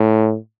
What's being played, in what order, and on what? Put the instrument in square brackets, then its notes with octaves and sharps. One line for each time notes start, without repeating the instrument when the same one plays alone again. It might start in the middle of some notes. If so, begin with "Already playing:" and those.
Already playing: [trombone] A2